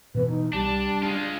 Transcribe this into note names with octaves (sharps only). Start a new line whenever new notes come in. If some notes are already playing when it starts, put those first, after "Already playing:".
B2 E3 B3 B4
D#4
C2 G3 D4 A5
G#3 D4 F4